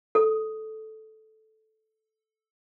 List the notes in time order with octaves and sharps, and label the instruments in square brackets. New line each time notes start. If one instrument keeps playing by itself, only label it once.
[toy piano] A4 D#6